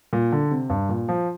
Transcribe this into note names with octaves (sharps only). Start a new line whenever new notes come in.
A#2
D3
C3
G2
A#2
F3